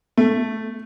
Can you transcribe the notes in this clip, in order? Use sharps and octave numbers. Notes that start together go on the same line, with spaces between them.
A3